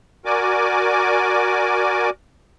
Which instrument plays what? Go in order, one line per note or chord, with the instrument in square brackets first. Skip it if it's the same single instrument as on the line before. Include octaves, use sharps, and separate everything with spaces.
[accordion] F#4 A#4 D5 G#5 D6